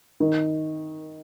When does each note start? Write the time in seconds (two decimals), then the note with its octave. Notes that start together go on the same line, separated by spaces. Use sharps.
0.20 D#3